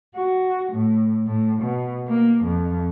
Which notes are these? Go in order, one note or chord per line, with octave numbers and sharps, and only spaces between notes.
F#4
A2
A2
B2
A#3
F2